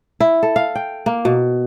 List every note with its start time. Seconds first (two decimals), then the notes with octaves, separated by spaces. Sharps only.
0.20 E4
0.43 A4
0.56 F5
0.75 G5
1.06 A#3
1.25 B2